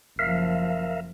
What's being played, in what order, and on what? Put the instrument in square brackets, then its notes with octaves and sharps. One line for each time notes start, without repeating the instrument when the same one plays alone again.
[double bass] F#1 F3 [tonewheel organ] A#4 E5 F5